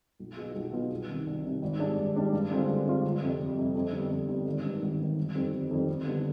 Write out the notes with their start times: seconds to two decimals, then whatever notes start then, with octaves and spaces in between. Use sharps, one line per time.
0.20 B1
0.37 B2 B3 F4 G#4
0.56 B1
0.73 B2 B3 F4 G#4
0.90 C2
1.09 C3 D#3
1.27 C2
1.44 C3 D#3
1.62 G#1
1.79 G#2 G3 D4 G#4
1.98 G#1
2.15 G#2 G3 D4 G#4
2.33 G2
2.51 D3 G#3 C4 F4
2.68 G2
2.86 D3 G#3 C4 F4
3.04 G1
3.22 F2 C3 G3
3.39 G1
3.57 F2 C3 G3
3.75 F2
3.92 D3 G3 B3
4.10 F2
4.28 D3 G3 B3
4.46 G#1
4.64 G2 D#3
4.82 G#1
4.99 G2 D#3
5.17 G1
5.35 F2 D#3 G3 C4
5.53 G1
5.71 F2 D#3 G3 C4
5.88 D2
6.06 D3 G3 B3